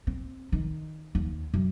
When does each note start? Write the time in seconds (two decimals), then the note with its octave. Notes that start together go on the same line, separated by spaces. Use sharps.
0.07 C4
0.52 D#3
1.15 D#2
1.54 F#2